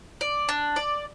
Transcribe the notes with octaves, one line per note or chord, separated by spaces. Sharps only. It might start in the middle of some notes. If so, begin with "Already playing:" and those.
D5
D4
D5